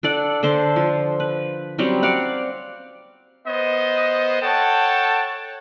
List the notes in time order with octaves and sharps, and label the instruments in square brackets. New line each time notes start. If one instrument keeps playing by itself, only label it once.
[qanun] D4 A4 D5 F#5
D3 A4 C5 A5
F3
B4
F#3 G3 C4 C#4
D5 F5 F#5
[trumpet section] B3 C5 D#5
A4 C#5 F#5 G5 A5